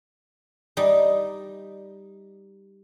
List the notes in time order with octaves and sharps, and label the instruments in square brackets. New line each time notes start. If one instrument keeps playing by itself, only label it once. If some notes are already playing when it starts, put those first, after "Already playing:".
[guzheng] G3 D#4